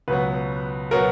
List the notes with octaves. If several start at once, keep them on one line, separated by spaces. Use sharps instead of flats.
C#2 B2 F#3 B3 B4
B2 F#3 B3 A#4